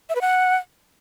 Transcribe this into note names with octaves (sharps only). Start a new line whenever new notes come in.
E5
B4
F#5